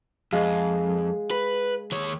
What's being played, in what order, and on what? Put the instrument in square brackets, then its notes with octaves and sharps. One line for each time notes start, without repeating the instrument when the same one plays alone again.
[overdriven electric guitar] F2 [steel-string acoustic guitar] G#3 G#4 F5
[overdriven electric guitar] B4
D#2 C#5